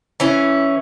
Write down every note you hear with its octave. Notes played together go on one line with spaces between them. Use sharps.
E3 C#4